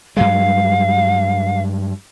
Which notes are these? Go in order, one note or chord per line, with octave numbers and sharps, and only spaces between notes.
G2 F#3 G#3 F5